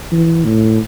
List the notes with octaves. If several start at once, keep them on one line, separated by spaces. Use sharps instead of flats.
E3
A2